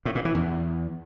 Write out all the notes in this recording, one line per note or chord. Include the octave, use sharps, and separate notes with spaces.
A2
A#2
E3
E2